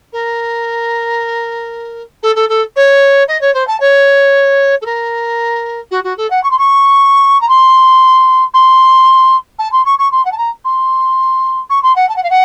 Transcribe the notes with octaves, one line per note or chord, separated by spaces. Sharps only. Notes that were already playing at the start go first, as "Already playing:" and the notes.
A#4
A4
A4
A4
C#5
D#5
C#5
C5
A5
C#5
A4
A#4
F#4
F#4
A4
F#5
C#6
C6
C#6
A#5
C6
C6
A5
C6
C#6
C#6
C6
F#5
A5
A#5
C6
C#6
C6
F#5
A5
F#5
F5
F#5